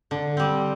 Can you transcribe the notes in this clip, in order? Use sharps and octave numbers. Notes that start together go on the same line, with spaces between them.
D3
G3 C4